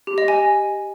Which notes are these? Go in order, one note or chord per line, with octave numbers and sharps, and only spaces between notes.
G4
D#5
G#5
D#5